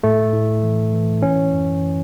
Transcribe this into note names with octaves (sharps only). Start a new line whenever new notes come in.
A2 A3
A2
E3
E3
E3 C#4
F#2
E3